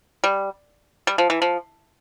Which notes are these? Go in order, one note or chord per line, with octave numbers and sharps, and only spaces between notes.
G3
G3
F3
E3
F3